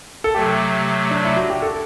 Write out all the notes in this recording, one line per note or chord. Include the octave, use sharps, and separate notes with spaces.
A4
C3 F#3 A3 G4
D4
E4
F#4
G4
A4